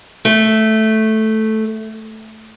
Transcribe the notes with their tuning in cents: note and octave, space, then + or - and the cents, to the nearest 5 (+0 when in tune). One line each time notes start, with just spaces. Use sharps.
A3 -5